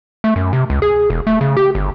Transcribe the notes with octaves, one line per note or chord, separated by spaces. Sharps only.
A3
F#2
C3
C#2
G#4
E1
A3
C#3
G4
G1